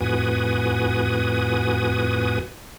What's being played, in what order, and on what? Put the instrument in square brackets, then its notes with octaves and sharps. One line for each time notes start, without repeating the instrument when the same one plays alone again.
[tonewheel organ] F2 A2 F#4 B4 G#5 D#6